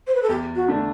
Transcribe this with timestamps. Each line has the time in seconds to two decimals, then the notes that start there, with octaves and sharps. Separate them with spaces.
0.07 C5
0.15 B4
0.22 A4
0.29 E2 G4
0.55 F#4
0.68 D3 A3 D4